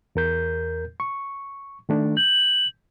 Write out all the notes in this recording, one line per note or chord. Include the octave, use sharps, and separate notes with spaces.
E2 A#4 G6
C#6
D#3 A3 D4
G6 F#7